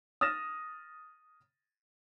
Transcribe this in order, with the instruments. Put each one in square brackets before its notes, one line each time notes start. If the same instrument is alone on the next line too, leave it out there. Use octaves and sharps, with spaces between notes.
[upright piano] D#6 F6 A6 A#6 E7